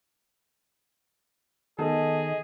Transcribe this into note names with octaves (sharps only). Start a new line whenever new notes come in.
D#3 B3 G#4 A4 D#5